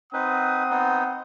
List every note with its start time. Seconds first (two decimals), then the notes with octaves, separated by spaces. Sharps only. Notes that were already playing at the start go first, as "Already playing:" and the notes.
0.13 C4 D#4 B4 F#5 D#6
0.71 B3 D#4